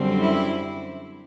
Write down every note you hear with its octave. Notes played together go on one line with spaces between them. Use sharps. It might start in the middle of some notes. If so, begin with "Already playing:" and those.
Already playing: F#2 D3 G3 C4
E4